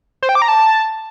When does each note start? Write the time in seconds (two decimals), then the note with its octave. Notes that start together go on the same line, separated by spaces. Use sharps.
0.23 C5
0.29 G5
0.35 D6
0.42 A#5
0.48 A5